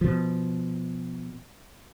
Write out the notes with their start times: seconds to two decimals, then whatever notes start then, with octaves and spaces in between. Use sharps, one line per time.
0.01 B2 F3